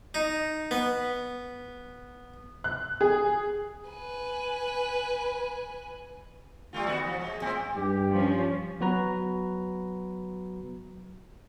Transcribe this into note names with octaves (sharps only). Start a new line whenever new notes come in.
D#4
B3
F#6
G#4
B4 G#5
G3 A3 F4
D#3 B3 F#4
F3
G#3
A2 G#3 C4
G2 G4
F3 C#4
F#3 B3 F#4 B4 A#5